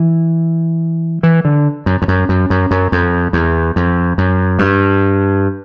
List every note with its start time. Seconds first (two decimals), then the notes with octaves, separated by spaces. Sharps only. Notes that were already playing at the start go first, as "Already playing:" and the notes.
Already playing: E3
1.23 E3
1.45 D3
1.86 F#2
2.02 F2
2.08 F#2
2.29 F#2
2.50 F#2
2.71 F#2
2.92 F2
3.33 E2
3.76 F2
4.18 F#2
4.59 G2